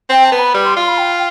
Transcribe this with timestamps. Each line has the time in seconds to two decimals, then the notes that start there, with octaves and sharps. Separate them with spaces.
0.10 C4 G5
0.25 A5
0.32 B3
0.39 B5
0.54 G3
0.65 C6
0.76 F4 C6
0.88 B5
0.98 G5